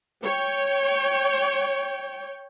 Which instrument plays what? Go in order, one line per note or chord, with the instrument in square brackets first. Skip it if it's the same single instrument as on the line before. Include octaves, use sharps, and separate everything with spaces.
[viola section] C#5 G5